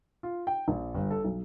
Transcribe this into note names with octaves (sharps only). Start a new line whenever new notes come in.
F4
G5
A#1
G1
A4
B1